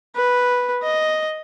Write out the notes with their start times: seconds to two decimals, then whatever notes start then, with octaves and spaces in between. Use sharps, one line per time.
0.15 B4
0.83 D#5